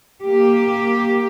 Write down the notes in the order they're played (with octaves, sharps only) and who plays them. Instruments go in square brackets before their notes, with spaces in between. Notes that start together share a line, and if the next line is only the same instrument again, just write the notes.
[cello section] A#3 G4